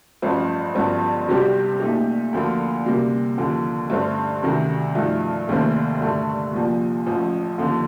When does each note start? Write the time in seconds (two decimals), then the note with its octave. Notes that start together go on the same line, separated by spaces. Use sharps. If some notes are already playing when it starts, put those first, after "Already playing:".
0.22 A1 G2 F3 A3 C4
0.75 G1 G2 F3 C4
1.28 C2 C3 G3 C4 G4
1.80 A#2 A3 D#4 G4
2.33 D2 D3 F3 A#3 F4
2.86 C3 G3 A#3
3.37 D#2 D3 F3
3.90 G2 D3 A3 C4
4.43 D2 C3 D#3 A3
4.95 G2 F3 A3 D#4
5.48 F1 D#2 D#3 A3 C4
6.01 G2 D3 A3
6.53 C2 A#2 F3
7.06 A1 A2 F3
7.58 D#2 D3 F3